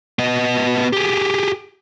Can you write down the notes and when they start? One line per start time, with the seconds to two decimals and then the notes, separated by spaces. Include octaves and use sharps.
0.19 B3 D#5
0.93 G4 G#4